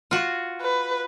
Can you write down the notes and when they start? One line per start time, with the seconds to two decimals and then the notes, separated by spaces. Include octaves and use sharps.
0.11 F4 F#4
0.62 B4